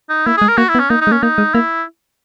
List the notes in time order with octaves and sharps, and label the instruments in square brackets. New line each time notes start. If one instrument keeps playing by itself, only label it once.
[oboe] D#4
[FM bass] A#3 [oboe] E4
[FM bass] G#3 [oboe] G#4
[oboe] A#4
[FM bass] A#3 [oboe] F#4
[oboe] E4
[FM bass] B3
[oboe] C#4
[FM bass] A#3 [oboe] D#4
[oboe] D#4
[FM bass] G#3
[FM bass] A#3 [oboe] C#4
[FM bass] A#3 [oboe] D#4
[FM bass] G#3
[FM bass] A#3 [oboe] E4